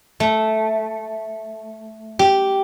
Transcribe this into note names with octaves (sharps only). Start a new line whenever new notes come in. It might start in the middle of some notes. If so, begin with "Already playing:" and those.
A3
G4